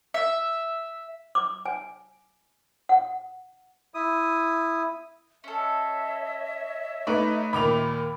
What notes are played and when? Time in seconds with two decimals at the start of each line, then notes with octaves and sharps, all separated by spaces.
0.14 E5
1.35 D6
1.66 G#5
2.89 F#5
3.94 E4 D#6
5.44 C#4 A4 C#5 D#5 E5
7.07 A3 D#4 B4 D5
7.53 D#2 A#2 B5 D6 F7